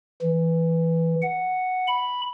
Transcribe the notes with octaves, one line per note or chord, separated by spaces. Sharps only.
E3
F#5
B5